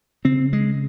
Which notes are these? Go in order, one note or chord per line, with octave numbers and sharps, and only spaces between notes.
C#3 C4
G#3